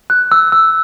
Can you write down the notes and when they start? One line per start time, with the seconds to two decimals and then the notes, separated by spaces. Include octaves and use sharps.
0.10 F#6
0.32 E6
0.52 E6